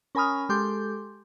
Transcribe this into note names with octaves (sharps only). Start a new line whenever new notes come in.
C#4 A#4 G#5 B5 D#6 F6
G#3 G4 A4 C6 D6 G6